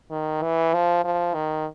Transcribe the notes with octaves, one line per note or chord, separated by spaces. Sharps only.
D#3
E3
F3
F3
D#3